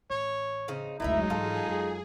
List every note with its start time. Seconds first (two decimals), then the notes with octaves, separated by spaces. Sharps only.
0.10 A1 C#5
0.68 C#3 C4 D#4
1.00 F#1 D2 F#3 G#3 D#4 E4 A#4 E5
1.30 G#2 E3 F4 G#4 A4
1.67 F#2